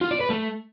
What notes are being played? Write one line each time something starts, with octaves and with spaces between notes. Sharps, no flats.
F4
D5
B4
A3